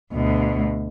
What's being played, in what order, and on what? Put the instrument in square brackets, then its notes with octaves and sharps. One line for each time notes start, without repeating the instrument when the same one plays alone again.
[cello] D2 B2